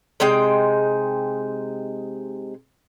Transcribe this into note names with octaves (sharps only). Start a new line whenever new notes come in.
C3 G#3 D#4 G5